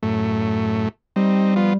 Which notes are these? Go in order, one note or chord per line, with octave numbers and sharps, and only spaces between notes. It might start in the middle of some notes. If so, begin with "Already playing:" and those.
F#2 A2 A3
G3 C4 D#4
F3 B3 F4